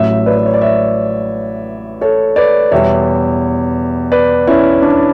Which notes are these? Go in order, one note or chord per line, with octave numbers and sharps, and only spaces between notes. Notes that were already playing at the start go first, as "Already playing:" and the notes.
Already playing: A1 A2 F#3 C#5 E5
B4 D5
B4
C#5
D5
C#5 E5
A4 C#5
B4 D5
E2 B2 G3 C#5 E5
B4 D5
C#4 E4
D4